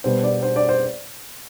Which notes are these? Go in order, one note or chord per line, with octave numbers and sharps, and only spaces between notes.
B2 G3 B3 C5
D5
C5
D5
C5